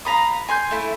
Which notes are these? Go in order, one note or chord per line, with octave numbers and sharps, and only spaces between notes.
F5 A#5 B5 D#6
G#5 C6 G6
A3 E4